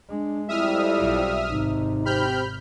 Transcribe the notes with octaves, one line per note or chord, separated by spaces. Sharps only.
G#3 D4
F2 G3 E4 E5 D#6 F6
B1
G#1 C3 D#4
C4 G4 B5 F6 G6